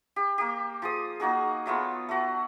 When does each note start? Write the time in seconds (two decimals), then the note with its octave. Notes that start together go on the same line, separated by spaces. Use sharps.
0.16 G4
0.38 A#3 G4
0.82 F3 G#4 D#6
1.20 A#3 D#4 F#4 G#4
1.66 F#3 A3 B3 F4
2.09 A3 F#4